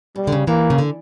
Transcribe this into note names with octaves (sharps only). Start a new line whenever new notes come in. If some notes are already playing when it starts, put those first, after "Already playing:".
B2 G3
D3
C#3
E3 A#3
C#3
D3